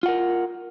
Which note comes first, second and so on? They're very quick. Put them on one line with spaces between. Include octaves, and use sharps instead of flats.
F4 F#5 A#4